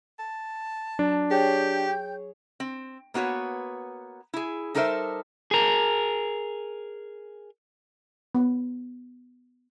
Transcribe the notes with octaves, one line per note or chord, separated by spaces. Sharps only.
A5
F#3 D4
G4 G#4 C#5 G5 G6
C4
A#3 B3 F#4 B4 C#5
E4 G#4
G3 D#4 A4 A#4 C5 E5
G#4 A#4
B3